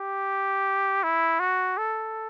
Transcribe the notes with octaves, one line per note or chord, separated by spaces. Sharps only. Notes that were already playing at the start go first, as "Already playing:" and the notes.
Already playing: G4
E4
F#4
A4